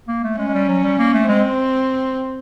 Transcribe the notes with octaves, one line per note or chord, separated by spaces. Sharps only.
A#3
A3
G#3 C#4
G#3
G3
F#3
G3
A#3
A3
G#3 C4